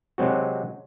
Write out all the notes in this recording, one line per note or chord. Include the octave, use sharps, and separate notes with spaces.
C3 F#3 G#3 C4 F#4